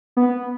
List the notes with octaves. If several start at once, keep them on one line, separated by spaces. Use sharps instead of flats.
B3